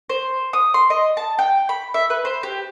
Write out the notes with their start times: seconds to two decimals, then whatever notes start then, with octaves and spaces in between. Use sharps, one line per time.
0.10 C5
0.53 D#6
0.74 C6
0.90 D#5
1.17 A5
1.39 G5
1.69 B5
1.94 E5
2.10 B4
2.25 C5
2.43 G4